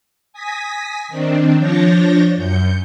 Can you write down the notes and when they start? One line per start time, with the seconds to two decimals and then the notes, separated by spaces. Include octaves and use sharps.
0.33 G#5 D#6 A#6 B6
1.08 D#3 C4 D4
1.56 F3 D4 C#5 G6 A6 A#6
2.36 F#2 G6 C#7